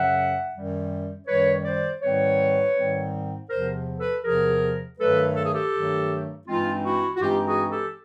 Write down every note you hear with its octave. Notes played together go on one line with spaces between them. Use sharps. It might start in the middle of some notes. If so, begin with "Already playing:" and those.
Already playing: F#2 C#3 F#3 E5 F#5
F#2 D#3 G3
F#2 D#3 G3 B4 C#5
C5 D5
G#2 D#3 G3 C4 B4 C#5
G#2 D#3 G3 C4
E2 C3 F3 A#4 C5
A4 B4
E2 C3 F3 G#4 A#4
G2 D#3 F#3 A3 A4 B4
A4
G#4
G4 A4
G2 D#3 F#3 A3
G2 E3 G#3 C4 D#4 F4
E4 F#4
F#4
G2 E3 G#3 C4 D#4 F4 G4
F#4 G#4
G4 A4